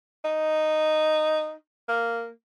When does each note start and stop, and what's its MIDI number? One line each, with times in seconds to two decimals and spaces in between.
0.25 1.54 63
1.88 2.30 58